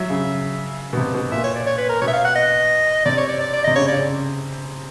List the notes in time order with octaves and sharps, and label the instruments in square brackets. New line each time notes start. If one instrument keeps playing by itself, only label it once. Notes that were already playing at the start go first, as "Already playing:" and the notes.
Already playing: [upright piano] F#3 [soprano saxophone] E5
[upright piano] C#3
B2
C3
B2
[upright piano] A#2 [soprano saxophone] E5
[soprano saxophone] C#5
D5
C#5
B4
A#4
[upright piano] B2 [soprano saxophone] C#5
[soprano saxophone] E5
F5
F#5
D#5
[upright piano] C3 [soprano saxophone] D5
[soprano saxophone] C#5
D5
D5
D5
[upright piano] C3 [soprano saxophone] D#5
[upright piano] C#3 [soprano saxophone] C#5
[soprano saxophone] D5
[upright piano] C#3